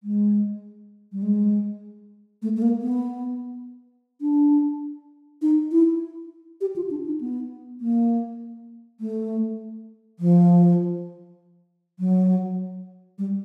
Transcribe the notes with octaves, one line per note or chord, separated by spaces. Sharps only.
G#3
G3
G#3
A3
A3
A#3
B3
D4
D#4
E4
G4
F4
D4
D#4
B3
A#3
A3
F3
F#3
G3